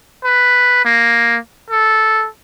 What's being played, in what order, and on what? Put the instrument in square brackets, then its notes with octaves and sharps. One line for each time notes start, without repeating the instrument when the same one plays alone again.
[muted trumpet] B4
A#3
A4